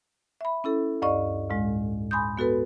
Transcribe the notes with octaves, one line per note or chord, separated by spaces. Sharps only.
E5 B5
C#4 E4 A4
D2 G2 D5 D#5 C#6
D2 A2 G#3
G#5 B5 C6 D#6 G6
B3 F#4 A4 B4